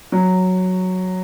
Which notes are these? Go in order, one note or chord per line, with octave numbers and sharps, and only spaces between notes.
F#3